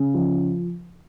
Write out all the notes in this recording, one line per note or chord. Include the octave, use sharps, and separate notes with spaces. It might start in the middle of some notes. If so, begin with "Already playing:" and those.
Already playing: C#3
F3